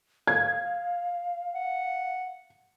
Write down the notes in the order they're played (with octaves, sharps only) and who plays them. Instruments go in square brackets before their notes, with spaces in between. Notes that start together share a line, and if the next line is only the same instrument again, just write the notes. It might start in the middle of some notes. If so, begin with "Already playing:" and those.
[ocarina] F5 [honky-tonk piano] G#6
[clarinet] F#5